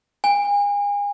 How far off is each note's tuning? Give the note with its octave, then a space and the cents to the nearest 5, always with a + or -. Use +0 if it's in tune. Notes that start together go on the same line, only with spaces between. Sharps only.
G#5 -35